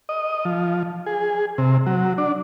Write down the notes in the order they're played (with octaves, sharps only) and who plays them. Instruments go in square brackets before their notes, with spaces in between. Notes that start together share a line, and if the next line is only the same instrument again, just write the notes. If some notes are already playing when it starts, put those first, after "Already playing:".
[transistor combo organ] D#5
F3
G#4
C3
F#3
D4